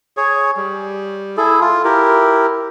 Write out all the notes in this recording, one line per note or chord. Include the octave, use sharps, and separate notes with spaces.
G#4 C#5
G3
E4 G#4 A4
F4
E4 G4 A#4